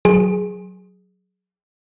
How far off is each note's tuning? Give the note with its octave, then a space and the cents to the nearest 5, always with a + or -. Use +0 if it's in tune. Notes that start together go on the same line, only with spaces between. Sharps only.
F#3 +0 G#4 +0